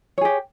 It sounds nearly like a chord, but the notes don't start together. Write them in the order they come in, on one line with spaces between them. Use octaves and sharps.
C#5 G#4 G4